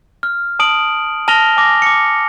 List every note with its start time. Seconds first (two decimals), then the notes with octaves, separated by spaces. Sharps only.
0.23 F6
0.59 A5 D#6 D7 F#7
1.28 A5 F6 A#6 F7 G7
1.57 G#5 D6 A#6
1.82 D6 C#7